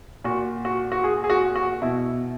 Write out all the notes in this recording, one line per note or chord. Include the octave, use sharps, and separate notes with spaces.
A#2 F#4
F#4
F#4
G#4
G#4
F#4
F#4
B2 E4